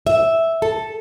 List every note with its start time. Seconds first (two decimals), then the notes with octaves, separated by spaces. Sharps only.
0.07 E5
0.62 A4